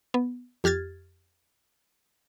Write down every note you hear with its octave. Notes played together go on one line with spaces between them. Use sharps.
B3
F2 G4 F6 G#6 A6